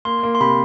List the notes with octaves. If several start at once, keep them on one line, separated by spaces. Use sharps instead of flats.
A#3 C6
A#3
C6
C3 B5